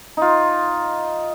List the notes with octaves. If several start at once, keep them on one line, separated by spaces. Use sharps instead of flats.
D#4 F4